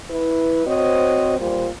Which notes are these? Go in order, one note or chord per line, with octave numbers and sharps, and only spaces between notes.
E4 B4
C4 F#4 C5 C#5 D#5
A#2 G3 F4 C5